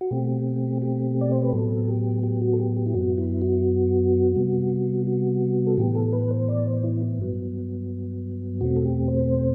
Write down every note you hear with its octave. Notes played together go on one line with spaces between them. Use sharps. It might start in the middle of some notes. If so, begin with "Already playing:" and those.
F#4
B2 A3 C4 G4
G4
D5
C5
B4
A2 F#3 B3 A4
G4
G4
F#4
A4
G4
G4
E4
F#2 F#3 B3 F#4
E4
F#4
C3 G3 B3
F#4
A4
A2 E3 B3 G4
A4
B4
C5
D5
C5
E4
G2 F#3 B3
E2 B2 A3 C4 F#4
A4
G4
C5